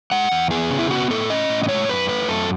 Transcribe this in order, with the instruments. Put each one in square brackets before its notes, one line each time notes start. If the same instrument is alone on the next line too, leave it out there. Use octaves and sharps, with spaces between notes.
[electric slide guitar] G#3 F#5
E2
B3 G#4
C#3
E4
B3 F#4
A2 A4
C#4 D#5
A2
D#5
G#3 C#5
F#2 B4
A3 B4
F#2 A4